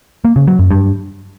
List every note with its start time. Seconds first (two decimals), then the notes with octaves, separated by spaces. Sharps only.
0.25 A#3
0.36 C#3
0.47 F#3
0.59 F#2
0.70 G2